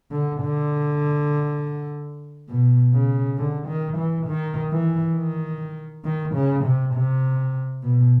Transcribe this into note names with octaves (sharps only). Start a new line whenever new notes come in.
D3
D3
B2
C#3
D3
D#3
E3
D#3
E3
D#3
D#3
C#3
C3
C3
B2